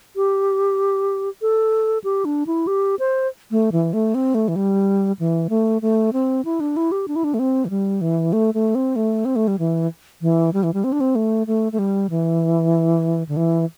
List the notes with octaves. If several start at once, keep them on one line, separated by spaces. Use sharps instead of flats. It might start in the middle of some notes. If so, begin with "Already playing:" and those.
G4
A4
G4
D4
E4
G4
C5
A3
E3
A3
C4
A3
E3
G3
E3
A3
A3
C4
E4
D4
E4
G4
D4
E4
D4
A3
C4
E3
G3
E3
A3
A3
C4
A3
C4
A3
G3
E3
E3
G3
E3
G3
C4
D4
C4
A3
A3
A3
G3
E3
D3
E3